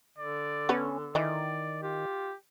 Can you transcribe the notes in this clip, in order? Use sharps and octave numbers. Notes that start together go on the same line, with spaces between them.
D3 D5
B3 C#4 D4 B4
D#3 E3 D5 D#5
F4 G4